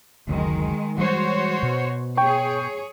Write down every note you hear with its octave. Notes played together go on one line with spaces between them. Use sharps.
F#1 D2 D#3 F#3 G#3
E3 G3 G#3 F#4 C5 C#5
B2
G#4 C#5 G5 C#6